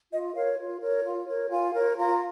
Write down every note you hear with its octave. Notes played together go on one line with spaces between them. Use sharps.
F4 D#5
A#4 C#5 F5
F4
A#4 C#5
F4
A#4 C#5
F4 G#5
A#4 C#5
F4 A#5